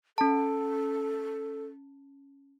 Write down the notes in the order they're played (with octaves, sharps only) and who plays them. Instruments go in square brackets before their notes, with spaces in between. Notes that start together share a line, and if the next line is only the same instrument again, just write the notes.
[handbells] C#4 A5 [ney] A4